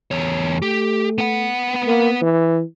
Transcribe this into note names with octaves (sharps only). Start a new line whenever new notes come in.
E2 C#5
A3 G4
B3 F#5
A#3
E3